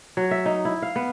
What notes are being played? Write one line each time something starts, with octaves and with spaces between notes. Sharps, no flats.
F#3
E5
D#4
E4
F5
B3